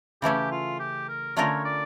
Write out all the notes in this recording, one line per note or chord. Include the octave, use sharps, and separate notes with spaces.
C#3 E3 A3 C#4 G4
F4
G4
A#4
D3 A3 C#4 F4 A#4 C#5
D5